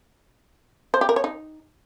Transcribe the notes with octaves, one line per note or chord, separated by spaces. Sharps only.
C5
G4
A#4
C#5
D#4